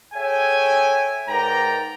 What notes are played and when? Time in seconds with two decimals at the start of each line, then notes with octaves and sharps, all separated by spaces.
0.14 G#4 A4 C#5 E5 G5 G#5
1.29 G#2 A#4 B4 D5 G5 A#5